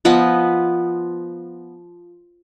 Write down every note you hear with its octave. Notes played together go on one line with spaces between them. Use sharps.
F3 B3 B4 D#5